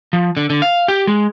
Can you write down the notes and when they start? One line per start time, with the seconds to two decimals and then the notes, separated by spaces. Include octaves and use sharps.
0.13 F3
0.37 D3
0.50 D3
0.62 F5
0.88 G4
1.07 G#3